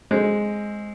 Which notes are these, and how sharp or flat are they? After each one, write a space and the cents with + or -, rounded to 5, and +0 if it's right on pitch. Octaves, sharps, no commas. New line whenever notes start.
G#3 +0 C4 +15